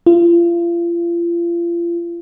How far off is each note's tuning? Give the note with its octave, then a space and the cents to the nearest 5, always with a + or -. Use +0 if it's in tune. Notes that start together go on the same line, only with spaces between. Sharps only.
F4 -35